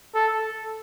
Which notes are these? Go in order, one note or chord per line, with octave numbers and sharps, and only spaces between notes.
A4